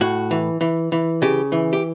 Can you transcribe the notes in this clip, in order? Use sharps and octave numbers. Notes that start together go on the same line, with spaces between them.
A2 F#4
E3
E3
E3
C#3 G4
E3
G4